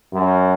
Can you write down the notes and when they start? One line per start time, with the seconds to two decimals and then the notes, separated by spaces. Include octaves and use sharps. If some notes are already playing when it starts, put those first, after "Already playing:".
0.13 F#2